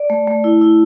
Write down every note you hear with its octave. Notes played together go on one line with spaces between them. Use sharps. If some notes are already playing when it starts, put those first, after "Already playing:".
Already playing: D5
A3
A3
E4
E4